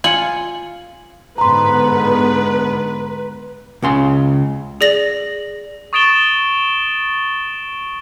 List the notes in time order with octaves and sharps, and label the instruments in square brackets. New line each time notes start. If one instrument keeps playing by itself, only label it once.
[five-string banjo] F4 [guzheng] G#5 [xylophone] C#7 F#7
[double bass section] G#2 D3 B3 [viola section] B4 [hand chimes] A#5 C6
[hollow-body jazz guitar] C#2 C#3 C6
[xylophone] G#4 D5 A#6 F#7
[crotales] C#6 D#6 A6 D7 E7 G7